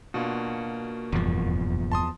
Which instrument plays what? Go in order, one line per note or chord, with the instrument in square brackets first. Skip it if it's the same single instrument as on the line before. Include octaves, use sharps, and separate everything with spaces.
[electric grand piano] B2 D4 F4 [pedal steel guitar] A#3 F#4
[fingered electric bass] F1 G2 A#2 [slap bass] E2 F3
[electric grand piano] A5 C6 D#6